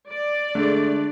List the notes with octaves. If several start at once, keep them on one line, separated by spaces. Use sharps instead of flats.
D5
D3 G#3 A3